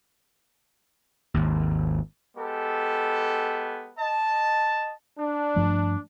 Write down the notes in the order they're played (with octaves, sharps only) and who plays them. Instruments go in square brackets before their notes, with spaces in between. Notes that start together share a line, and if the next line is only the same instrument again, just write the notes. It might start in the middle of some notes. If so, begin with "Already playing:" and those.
[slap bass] G#1 D#2
[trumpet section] G#3 B3 G4 A4
D#5 A5
[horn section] D4
[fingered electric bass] G2 F3 A3